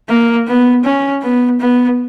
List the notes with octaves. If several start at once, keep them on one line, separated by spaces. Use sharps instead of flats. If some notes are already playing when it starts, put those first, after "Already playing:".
A#3
B3
C#4
B3
B3